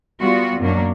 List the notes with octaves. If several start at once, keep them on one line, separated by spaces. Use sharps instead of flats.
G3 B3 F4 F#4
F#2 B2 F#3 A#3 D4